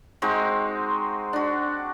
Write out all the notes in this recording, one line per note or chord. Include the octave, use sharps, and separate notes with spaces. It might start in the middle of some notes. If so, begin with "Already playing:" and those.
G#3 C4 D#4 F#4
D4 F#4